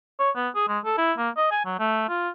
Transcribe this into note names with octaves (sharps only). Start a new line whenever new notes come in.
C#5
B3
G#4
G#3
A4
E4
A#3
D#5
G#5
F#3
A3
F4